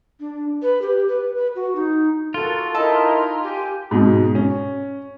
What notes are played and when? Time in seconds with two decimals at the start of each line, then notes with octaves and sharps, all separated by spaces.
0.20 D4
0.62 B4
0.82 G4
1.09 B4
1.36 B4
1.56 F#4
1.76 D#4
2.34 F4 F#4 A4 A#4
2.75 D#4 E4 A4 A#4 D#5
3.43 G4 G#5
3.91 G#2 B2
4.35 C#4